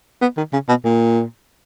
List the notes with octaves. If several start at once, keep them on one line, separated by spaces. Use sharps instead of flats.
B3
D#3
C#3
B2
A#2